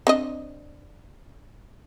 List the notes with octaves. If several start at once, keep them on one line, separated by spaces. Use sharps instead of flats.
C4 D4 D#5